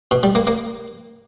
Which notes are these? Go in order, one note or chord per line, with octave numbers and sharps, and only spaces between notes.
B2
G3
A#3
A#3